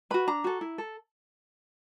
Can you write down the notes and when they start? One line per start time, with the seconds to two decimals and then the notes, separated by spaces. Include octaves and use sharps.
0.10 F#4 B4 B5
0.27 D4 A#5
0.44 F#4 A4
0.61 E4
0.78 A4